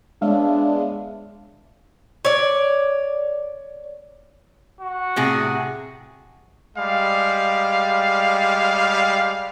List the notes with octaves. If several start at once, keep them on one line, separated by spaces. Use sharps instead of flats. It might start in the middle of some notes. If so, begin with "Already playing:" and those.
G#3 B3 D4 C#5 E5 F5
C#5 D5
F#4
A2 C3 G#4
G3 G#3 F5